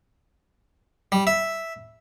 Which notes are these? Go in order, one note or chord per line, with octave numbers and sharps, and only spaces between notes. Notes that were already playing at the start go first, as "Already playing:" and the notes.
G3
E5